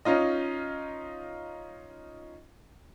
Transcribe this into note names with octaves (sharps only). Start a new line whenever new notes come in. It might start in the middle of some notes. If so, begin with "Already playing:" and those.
C#4 D#4 F4 D#5